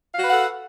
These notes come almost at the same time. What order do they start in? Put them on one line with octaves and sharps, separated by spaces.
F5 F#4 B4 F#5 A4